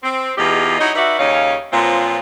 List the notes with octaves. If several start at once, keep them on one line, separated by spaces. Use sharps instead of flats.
C4
E2 B2 D#4 F4 G4 G#4
D#4 E4 F#4 C#5 D#5
D#4 F#4 B4 D5 E5
D#2 C#3 C#4 D#4 C#5 F5
A#2 F3 F#3 B3 C4 F4